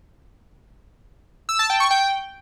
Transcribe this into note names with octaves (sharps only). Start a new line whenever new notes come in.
E6
A5
G5
C#6
G5